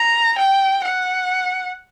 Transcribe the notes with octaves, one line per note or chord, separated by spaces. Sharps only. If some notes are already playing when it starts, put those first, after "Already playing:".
Already playing: A#5
G5
F#5